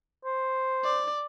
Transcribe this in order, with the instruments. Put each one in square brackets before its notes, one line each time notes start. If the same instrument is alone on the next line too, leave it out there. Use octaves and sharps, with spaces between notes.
[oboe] C5
[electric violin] D5